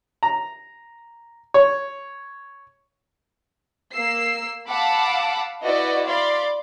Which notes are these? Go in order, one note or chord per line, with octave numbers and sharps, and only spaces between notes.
A#5
C#5
A#3 E6 C7
F5 F#5 A5 B5 D6 E6
E4 F#4 B4 D5 D#5 F#5
D5 F5 B5 C6